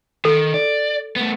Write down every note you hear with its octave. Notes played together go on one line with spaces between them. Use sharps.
D#3 A4
D5
A3 B3